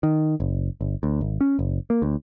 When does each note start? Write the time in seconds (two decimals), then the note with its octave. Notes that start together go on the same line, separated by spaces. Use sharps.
0.03 D#3
0.40 F#1
0.81 G1
1.03 D2
1.21 G#1
1.41 C#4
1.59 F#1
1.90 A#3
2.02 D2